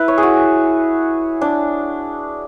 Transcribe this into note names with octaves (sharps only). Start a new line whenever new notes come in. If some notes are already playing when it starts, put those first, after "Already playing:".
Already playing: E4 B4
C#5
G#4
F#4
D4